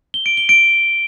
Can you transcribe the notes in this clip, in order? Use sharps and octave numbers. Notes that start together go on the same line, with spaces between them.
G7
D7
G7
D7